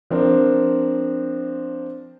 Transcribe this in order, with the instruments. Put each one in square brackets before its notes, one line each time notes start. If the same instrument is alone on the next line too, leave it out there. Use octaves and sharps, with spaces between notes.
[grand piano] F3 C4 D4 A#4